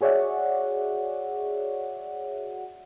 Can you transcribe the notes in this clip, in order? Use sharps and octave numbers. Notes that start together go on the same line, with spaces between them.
F#4 G#4 C#5 D5 E5 F#5